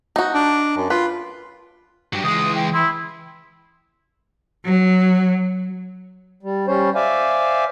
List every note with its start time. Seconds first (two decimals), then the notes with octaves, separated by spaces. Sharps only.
0.16 D#4 F#4
0.34 D4
0.77 F#2
0.90 F4 B4
2.13 G2 F#3 G4
2.24 C#2 E3 G#3 D#6
2.55 G5
2.74 E4 C6
4.65 F#3
6.43 G3
6.67 G3 C#4 C5 C#5
6.95 C5 D5 E5 F5 G#5